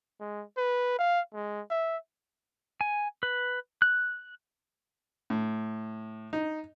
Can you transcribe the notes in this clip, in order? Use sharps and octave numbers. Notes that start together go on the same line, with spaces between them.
G#3
B4
F5
G#3
E5
G#5
B4
F#6
A2
D#4